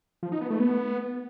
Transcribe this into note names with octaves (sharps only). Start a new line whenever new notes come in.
F3
D#4
B3
A3
B3